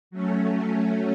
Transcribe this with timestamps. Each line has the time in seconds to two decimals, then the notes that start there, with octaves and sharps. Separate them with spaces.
0.11 F#3 A3 C#4